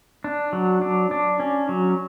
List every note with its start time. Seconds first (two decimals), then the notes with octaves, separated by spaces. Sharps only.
0.24 D4
0.53 F#3
0.82 D4
1.11 D4
1.40 C#4
1.69 F#3